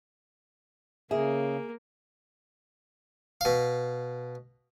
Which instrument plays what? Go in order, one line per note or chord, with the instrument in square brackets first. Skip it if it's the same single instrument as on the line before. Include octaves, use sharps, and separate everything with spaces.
[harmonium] C#3 [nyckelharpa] A#3 [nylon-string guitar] G#4 [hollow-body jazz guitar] E5
[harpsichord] B2 F5